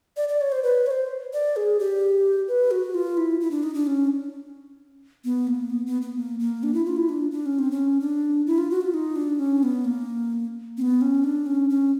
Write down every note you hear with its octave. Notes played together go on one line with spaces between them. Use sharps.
D5
D5
C#5
C5
B4
C#5
C5
D5
G#4
G4
B4
F#4
F4
E4
E4
D4
D#4
D4
C#4
B3
A#3
B3
B3
B3
A#3
A#3
D4
E4
F4
E4
D4
D4
C#4
C4
C#4
D4
E4
F4
F#4
F4
D#4
D4
C#4
B3
A#3
C4
B3
C#4
D4
C#4
C#4